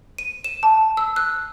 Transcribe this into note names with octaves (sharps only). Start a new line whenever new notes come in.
D#7
E7
A5
E6
F#6